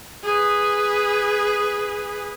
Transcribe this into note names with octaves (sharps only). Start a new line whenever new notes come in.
G#4 B4